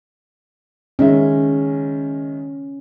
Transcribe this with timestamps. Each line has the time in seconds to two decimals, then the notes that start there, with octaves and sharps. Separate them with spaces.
0.99 D#3 G#3 C#4 E5